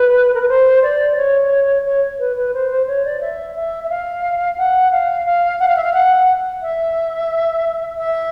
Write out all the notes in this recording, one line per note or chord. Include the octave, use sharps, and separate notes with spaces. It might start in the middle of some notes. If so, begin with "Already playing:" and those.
Already playing: B4
A#4
B4
C5
D5
C#5
C#5
B4
B4
C5
C5
C#5
D5
E5
E5
E5
F5
F#5
F5
F5
F#5
F5
E5
F5
F#5
E5
E5